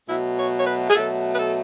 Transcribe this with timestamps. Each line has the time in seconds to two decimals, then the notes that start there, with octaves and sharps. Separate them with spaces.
0.09 B2 F#3 A3 E4
0.38 C#5
0.58 C#5
0.66 B4
0.90 G#4
0.95 B2 F#3 A3 A4
1.33 B4
1.38 A4